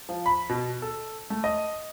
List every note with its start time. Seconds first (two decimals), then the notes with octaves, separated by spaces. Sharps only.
0.09 F3
0.26 B5
0.50 B2
0.82 A4
1.30 A3
1.44 D#5